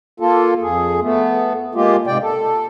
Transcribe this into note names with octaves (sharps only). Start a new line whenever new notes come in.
A#3 F4 A4
F2 G#4
A3 B3
G#3 A#3 F4 G4
G#2 C3 G#3 D5 G5
A4